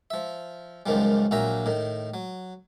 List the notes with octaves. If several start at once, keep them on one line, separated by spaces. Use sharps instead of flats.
F3 E5
C#2 F#2 D#3 F3 G3
A#1 A#2 F#3 E5 A#5
A2 D#3
F#3